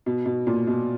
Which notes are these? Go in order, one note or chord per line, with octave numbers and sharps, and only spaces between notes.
B2
B2
A#2
B2